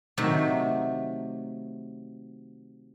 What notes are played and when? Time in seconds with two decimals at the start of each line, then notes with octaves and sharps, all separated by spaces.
0.17 C3 D#3 F#3 A3